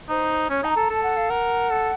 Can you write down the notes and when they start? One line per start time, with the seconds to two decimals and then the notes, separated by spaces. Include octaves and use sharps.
0.09 D#4 C5
0.50 C#4 C#5
0.63 D#4 A5
0.70 A#5
0.76 A4
0.89 A4 A5
1.03 F#5
1.17 F5
1.29 A#4 F#5
1.70 A4